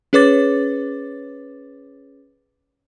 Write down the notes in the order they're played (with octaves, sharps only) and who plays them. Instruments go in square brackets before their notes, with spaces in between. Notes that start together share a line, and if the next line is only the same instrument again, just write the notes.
[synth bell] C#4 G#4 B4 C#5 D6 A6